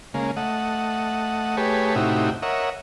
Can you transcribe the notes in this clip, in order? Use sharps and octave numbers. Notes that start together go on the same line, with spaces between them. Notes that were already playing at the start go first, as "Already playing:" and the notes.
C#3 G#3 A#3
A3 D#5 F#5
A3 G4 G#4 B4 C#5
A2 C3 D#4 E4 F#4 G4
A#4 C#5 D#5 E5 F#5